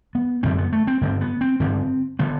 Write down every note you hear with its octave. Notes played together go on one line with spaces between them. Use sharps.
B3
F#2 D3 C4
B3
A3
C4
G2 D3 C4
B3
C4
G2 D3 C4
D3 B3